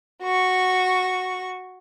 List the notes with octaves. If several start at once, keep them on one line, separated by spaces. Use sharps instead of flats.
F#4 C#6